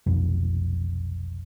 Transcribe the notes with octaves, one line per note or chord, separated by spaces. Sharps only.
F1 B1 F2